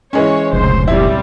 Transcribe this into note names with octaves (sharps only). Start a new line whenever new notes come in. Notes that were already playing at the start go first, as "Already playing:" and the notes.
E3 G#3 C#4 C#5
F1 C#2 A#2 C#3 C5
G3 C4 E4